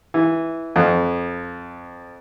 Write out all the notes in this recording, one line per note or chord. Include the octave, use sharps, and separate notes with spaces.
E3
F2